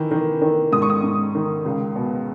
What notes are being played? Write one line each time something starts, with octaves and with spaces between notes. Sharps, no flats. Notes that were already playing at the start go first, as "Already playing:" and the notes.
Already playing: D#3 E3
D#3
D#3
G#2 D#6
C#6
D#6
G#2
D#3
C#2
B2